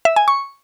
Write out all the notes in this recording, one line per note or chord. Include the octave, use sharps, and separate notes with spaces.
E5
G#5
C#6